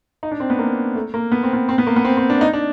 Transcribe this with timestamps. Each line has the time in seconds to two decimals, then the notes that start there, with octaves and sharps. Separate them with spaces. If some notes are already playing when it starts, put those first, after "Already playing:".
0.23 D#4
0.31 D4
0.40 C4
0.50 B3
0.59 A#3
0.95 A3
1.14 A#3
1.32 B3
1.43 C4
1.53 B3
1.69 C4
1.78 B3
1.87 A#3
1.96 B3
2.05 C4
2.17 C4
2.30 D4
2.41 D#4
2.53 D4